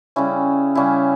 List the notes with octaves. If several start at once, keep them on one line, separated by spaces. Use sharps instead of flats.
C#3 G3 C#4 E4
C#3 G3 C#4 E4